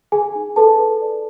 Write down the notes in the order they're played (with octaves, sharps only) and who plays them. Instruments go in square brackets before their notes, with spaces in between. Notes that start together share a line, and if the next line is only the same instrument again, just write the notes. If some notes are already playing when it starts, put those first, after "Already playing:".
[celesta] G#4 G#5
D#4
A4 B4 A5
B4
D5